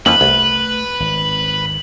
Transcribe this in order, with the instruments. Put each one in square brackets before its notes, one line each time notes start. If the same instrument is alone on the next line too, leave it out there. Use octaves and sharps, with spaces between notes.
[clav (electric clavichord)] F2 E3 F3 [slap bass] A#3 C#4 [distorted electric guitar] B4 [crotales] F#7
[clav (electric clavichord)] C2 [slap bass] A3
[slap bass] G#1